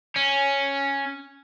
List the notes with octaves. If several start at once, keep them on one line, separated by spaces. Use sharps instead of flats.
C#4